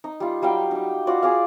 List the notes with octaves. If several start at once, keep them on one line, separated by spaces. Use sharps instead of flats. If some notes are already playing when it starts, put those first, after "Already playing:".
D#4
G3 F4
F#3 G3 F5 G5
D#4 G4
F4 F#4 D5
G#4 D5 F5